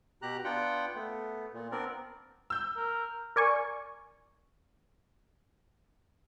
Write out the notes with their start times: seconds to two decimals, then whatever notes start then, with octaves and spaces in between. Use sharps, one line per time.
0.22 B2 G4 A#5 F#6
0.44 B3 D4 F4 F#5 G5
0.95 A3 B3
1.53 A#2
1.72 B3 C4 D4 A#4 D5
2.50 E6 G6
2.77 A#4
3.36 A#4 D5 G#5 C#6